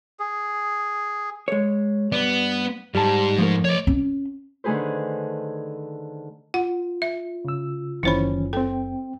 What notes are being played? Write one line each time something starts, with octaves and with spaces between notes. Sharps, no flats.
G#4
G#3 C#5
G2 B3 D5
G#2 G3 A5
F3 A3 A#4
C#5 D5
C#4
D3 D#3 A3 G#4 B4 C5
F4 F#5
E5
C#3 E6
F#1 D#3 E3 C#4 E4 C5 B5
C4 A4 G5